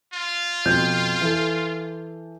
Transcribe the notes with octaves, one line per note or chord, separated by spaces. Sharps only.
F4
F2 B2 G6
E3 A4